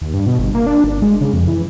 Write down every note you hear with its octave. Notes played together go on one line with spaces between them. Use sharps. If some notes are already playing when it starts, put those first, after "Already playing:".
D#2
G2
B2
G1
A#3
D4
G1
G#3
C#3
F2
E3